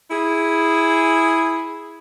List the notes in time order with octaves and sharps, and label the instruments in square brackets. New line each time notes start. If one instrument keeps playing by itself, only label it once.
[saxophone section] E4 G#4